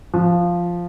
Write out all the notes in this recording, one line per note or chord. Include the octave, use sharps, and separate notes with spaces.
F3